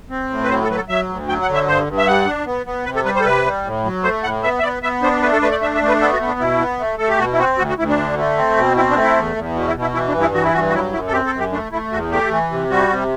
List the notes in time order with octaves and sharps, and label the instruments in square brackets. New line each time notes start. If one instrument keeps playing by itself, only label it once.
[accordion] C4
A2
B4
F#3 C5
A4
F#3 B4
A4
F#3 E5
D2
F#3 G5
F#5
D3
E5
G2 C5
G2
E5
G3 F#5
D4
B3
B3
C3 B4
A4
G3 B4
C5
A4
C3 B4
G3
A2
F#3
A3 C5
A2 F#5
B3 E5
E5
B3 D5
B3 E5
D4 C5
A3 B4
A4
A3 B4
D5
D4 E5
E5
A3
B4
B3 A4
F#4
B3
D4
B2 E4
B3
A3
A3 A4
G4
B2 F#4
E4
C4 F#4
D2 F#4
F#4
D2 E4
D4
D3
A3
C4
B2
C4 E4
D4
A3
E4
E2
E2
B2
E4
B2
E4
E3 E4
D4
G2
E4
E3 F#4
E4
G2 F#4
F#4
F#3 E4
F#2 E4
A4
C4 G4
A4
F#2
G4
A3 D4
A3 E4
E2 F#4
A3 G4
E3
C3
G3 F#4
C3